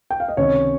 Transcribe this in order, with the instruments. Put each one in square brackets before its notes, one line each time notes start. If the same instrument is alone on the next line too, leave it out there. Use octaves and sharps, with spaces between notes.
[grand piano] G5
F5
D#5
C#2 C3 D#3 C#4 C#5